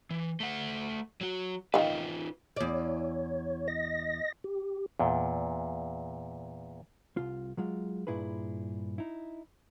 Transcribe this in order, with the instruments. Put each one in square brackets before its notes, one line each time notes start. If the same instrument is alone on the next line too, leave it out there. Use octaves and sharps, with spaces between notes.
[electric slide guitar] E3
A3 F#5
F#3 F#4
[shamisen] D#3 F5 [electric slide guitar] D#4 F4 B4
[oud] E2 D5 [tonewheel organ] C#5
[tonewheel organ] D#5 A#6
G4
[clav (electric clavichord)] E2 A#2
[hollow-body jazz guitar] C2 F4
F#3 G#3 F4
G2 A#2 E4 G#4 B4
D#4 E4